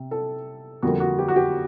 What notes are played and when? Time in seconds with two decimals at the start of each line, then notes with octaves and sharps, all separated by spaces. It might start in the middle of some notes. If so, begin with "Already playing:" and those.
Already playing: C3
0.11 A4
0.82 F2 D3 G3 A#3 F#4
1.00 F#4
1.19 G4
1.28 F#4
1.36 G4